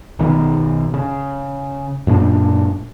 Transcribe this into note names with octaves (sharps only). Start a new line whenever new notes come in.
B1 D#3 B3
C#3
F#2 A#2 B3 D4